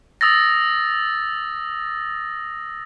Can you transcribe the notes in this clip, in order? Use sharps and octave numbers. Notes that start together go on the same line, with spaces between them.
D#6 E6 A6 A#6